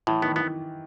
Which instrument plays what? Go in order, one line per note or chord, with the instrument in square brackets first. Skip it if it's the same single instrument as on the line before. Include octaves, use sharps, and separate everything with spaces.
[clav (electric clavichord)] A2 [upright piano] E3
[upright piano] D#3 [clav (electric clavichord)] B3
[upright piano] E3 [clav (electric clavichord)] B3